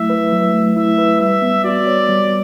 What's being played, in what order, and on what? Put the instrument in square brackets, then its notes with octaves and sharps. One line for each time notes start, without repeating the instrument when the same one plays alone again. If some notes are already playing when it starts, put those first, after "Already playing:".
Already playing: [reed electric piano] F#3 A3 E4 [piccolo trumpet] E5
[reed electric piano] B4
F#3
A3
[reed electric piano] E4 [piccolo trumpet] E5
[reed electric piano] B4
[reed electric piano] G3 [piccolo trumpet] E5
[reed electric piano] B3
[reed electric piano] F#4 [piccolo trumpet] D5
[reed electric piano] C#5
G3